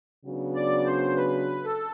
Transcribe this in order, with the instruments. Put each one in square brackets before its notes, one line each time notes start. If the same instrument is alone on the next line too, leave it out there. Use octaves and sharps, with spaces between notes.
[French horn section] C#3 F#3 B3 D4 F#4
[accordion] D5
C5
B4
A4